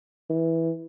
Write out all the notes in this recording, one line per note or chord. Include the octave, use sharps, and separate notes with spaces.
E3